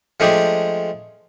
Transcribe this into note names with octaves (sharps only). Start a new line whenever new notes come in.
F3 G#3 A3 D4 G4 G#4